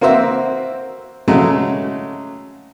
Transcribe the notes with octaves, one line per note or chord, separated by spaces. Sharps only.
A#3 C4 F#4 C5 E5
C#3 F#3 G#3 A3